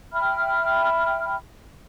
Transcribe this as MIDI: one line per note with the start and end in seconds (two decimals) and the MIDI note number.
0.12 1.35 76
0.12 1.35 79
0.12 1.35 83
0.12 1.35 89